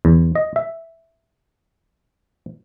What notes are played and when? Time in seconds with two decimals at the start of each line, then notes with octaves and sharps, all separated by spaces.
0.05 E2
0.35 D#5
0.56 E5